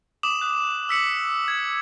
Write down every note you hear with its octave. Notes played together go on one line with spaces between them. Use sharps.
D6 D#6 E7 F#7
D#6 F#6
E6 B6 C#7 F#7
G#6 B6